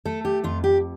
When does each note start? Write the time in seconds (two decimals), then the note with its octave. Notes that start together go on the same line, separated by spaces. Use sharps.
0.05 A3 A4
0.25 G4
0.44 F2 F4
0.64 G4